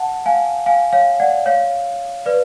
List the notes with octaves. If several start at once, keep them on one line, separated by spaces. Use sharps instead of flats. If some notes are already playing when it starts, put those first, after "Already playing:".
Already playing: F#5 A5
F5 G#5
F5 G#5
C#5 F5
D5 F#5
C#5 F5
B4 D5